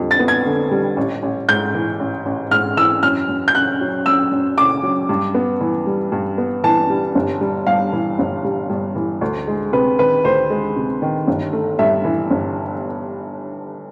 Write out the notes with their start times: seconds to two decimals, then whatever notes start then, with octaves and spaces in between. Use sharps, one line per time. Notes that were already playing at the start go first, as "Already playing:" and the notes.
Already playing: F2 D3 G3
0.11 A6
0.20 B3
0.28 G#6
0.46 D3
0.71 G3
0.97 A1
1.23 A1
1.49 G#2 G6
1.74 E3
2.00 A1
2.26 A1
2.51 G#2 F6
2.77 E3 E6
3.03 F#2 F6
3.29 F#2
3.48 G6
3.55 C#3 F#6
3.81 F#3
4.06 F#2 E6
4.32 F#2
4.57 C#3 D6
4.83 F#3
5.09 G2
5.35 B3
5.61 E3
5.87 G3
6.12 G2
6.38 B3
6.64 E3 A5
6.90 G3
7.15 G1
7.41 G3
7.67 G2 F5
7.93 E3
8.19 G1
8.44 G3
8.70 G2
8.96 E3
9.21 D2
9.47 G#3
9.73 C3 B4
9.99 D#3 B4
10.24 D2 C5
10.50 G#3
10.76 C3
11.02 D#3
11.27 G1
11.53 A3
11.79 G2 E5
12.05 E3
12.30 G1